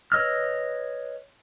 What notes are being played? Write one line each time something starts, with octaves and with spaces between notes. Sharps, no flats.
B4 C#5 D#5 E6 F6